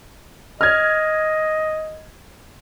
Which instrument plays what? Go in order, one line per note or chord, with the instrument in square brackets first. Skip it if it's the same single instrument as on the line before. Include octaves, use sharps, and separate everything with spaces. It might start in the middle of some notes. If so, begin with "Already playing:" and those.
[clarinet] D#5 [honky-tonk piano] F6 G#6